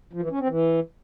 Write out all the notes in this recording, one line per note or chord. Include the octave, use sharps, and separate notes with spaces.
F3
E3
C#4
C4
E3